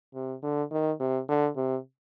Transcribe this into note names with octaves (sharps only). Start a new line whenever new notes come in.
C3
D3
D#3
C3
D3
C3